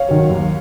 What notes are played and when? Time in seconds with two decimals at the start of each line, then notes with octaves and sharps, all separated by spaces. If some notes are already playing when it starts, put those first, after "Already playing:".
Already playing: C#5 F5
0.08 D#3 F#3
0.30 D#2